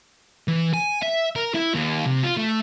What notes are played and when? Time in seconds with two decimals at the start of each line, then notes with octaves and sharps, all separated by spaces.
0.48 E3
0.74 G#5
1.03 E5
1.36 A#4
1.55 E4
1.74 D#2
2.07 C3
2.24 F4
2.37 A3